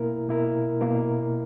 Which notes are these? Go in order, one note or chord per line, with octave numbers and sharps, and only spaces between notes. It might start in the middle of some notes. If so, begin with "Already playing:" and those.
Already playing: B2 A#3 E4 A#4
B2 A#3 E4 A#4
B2 A#3 E4 A#4